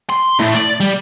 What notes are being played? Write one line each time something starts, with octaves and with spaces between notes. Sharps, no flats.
C6
A3 E4
D5
G3